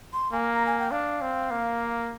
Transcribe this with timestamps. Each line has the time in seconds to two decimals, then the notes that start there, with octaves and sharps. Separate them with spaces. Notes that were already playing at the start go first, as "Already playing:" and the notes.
0.13 C6
0.33 A#3 G#5
0.53 A#5
0.66 G#5
0.79 G5
0.91 D4 F5
1.22 C4
1.51 A#3